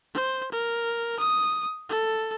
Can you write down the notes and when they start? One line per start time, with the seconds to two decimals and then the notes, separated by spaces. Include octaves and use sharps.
0.14 C5
0.51 A#4
1.19 D#6
1.90 A4